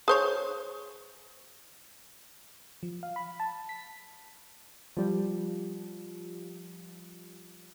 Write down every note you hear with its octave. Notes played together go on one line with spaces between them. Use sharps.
G#4 C5 C#5
F3
F5
B5
A5
B6
F3 G3